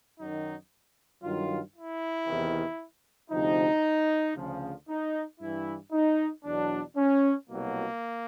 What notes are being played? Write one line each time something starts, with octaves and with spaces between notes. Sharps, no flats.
F#2 D#3 F#3 D#4
G2 D#3 F#3 F4
E4
E2 C3 D#3
D2 C3 F3 D#4
D2 C#3 F3
D#4
G2 E3 E4
D#4
E2 B2 F#3 D4
C#4
C2 B2 F#3 A#3